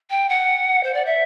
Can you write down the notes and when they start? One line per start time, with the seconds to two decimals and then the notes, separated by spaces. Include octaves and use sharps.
0.10 G5
0.29 F#5
0.83 C5
0.94 D5
1.05 E5